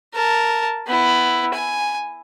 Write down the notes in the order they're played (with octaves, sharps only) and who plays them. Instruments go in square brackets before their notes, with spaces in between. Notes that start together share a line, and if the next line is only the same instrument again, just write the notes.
[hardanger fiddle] A#4 A5
B3 E4
G#5